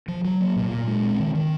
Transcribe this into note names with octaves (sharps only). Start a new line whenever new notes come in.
F3
F#3
A#3
A#2
A#2
G#3
C4
D#3
D#3